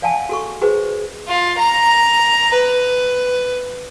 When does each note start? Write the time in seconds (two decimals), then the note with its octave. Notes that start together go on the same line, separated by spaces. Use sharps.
0.02 D5 F5 F#5 G#5 A5
0.29 F#4 A4 C#6
0.61 F#4 G#4 B4 C5
1.28 F4
1.59 A#5
2.54 B4